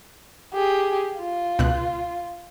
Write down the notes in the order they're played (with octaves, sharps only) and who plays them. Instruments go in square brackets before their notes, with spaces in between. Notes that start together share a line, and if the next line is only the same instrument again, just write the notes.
[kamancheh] G4 G#4
F4
[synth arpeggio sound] C#2 B2 F#6